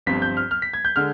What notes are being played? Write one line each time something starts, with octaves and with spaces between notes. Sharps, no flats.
G1 G2 F3 C4 B6
G6
F6
F6
B6
G#6
G6
D3 G#3 F6